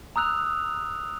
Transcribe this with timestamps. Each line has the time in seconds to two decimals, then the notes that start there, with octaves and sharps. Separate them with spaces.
0.16 A#5 D#6 E6 F#6 F7